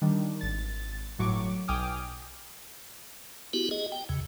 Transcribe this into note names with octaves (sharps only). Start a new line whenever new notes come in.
D#3 G3 D4
G#1 A6
G1 A2 F#3 C#6 D6
B1 G5 G#5 D6 D#6 F6
B3 E4 F#4 G4
G#4 D#5
G5
E2 C#3